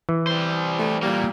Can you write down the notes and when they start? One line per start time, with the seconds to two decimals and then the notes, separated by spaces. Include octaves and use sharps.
0.09 E3
0.27 G3 C5
0.79 A3
1.03 A#2 G3 A#3